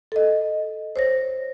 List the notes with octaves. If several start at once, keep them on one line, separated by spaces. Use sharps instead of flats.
A4 D#5
C5 C#5 A#6